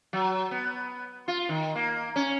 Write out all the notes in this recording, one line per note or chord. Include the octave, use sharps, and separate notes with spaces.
F#3
B3
F4
D#3
A#3
C#4